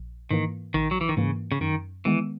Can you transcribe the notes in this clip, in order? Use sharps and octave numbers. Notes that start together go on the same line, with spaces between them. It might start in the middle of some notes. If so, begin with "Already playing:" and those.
Already playing: A#1
G#2 D#3 E3 A#3
A#1 D#3
F#3
E3
D#3
G#2 C#3 E3 A#3
C#3
F#2 D#3
D#3 E3 G#3 B3